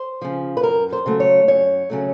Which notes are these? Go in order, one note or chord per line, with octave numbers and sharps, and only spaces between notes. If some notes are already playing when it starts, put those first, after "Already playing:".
Already playing: C5
C#3 F3
B4
F#2 A#4
C5
C#3 F#3 A3
C#5
F#2 C#5
C#3 F#3 A3